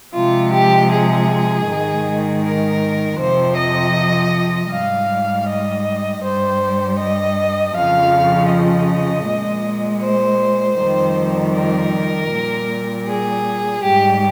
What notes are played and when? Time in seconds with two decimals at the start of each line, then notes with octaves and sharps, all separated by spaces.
0.15 C3 F3 G#3 F4
0.54 G4
0.91 G#4
1.68 G#2 D#3 G#3
2.44 A#4
3.19 F2 C3 F3 C5
3.57 D#5
4.71 G#2 G3 F5
5.47 D#5
6.23 G2 G3 C5
6.99 D#5
7.75 F2 C#3 F3 F5
8.51 D#5
9.27 A#2 G#3
10.03 C5
10.80 F2 D#3 G3
11.56 A#4
12.32 A#2 G3
13.08 G#4
13.83 G#2 G3 G4